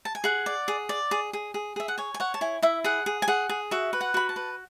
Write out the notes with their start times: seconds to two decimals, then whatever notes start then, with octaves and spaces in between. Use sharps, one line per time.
0.05 A5
0.15 G#5
0.24 G#4 F#5
0.46 D5
0.68 G#4
0.89 D5
1.11 G#4
1.33 G#4
1.54 G#4
1.76 G#4 E5
1.88 F#5
1.98 C#5 G#5
2.14 G#5
2.20 C#5 F#5
2.34 A5
2.41 E4 G#5
2.62 E4 E5
2.84 G#4 F#5
3.06 G#4
3.22 G#5
3.28 G#4 F#5
3.49 G#4
3.71 F#4 E5
3.93 B4
4.01 F#5
4.14 F#4 B5
4.29 A5
4.36 B4